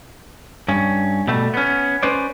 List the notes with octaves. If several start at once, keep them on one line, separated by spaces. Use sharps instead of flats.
G2 C#4
B2 G3 A3
B3 C#4
C#4 B4 C5 D5